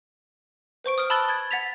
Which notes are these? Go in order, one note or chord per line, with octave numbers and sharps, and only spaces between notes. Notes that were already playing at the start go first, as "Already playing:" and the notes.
B4 C5 C#6 D7
D#6 F6 D7
A5 B5 E6 F#6 A6 G7
G#6 A6
F#5 A6 B6 F7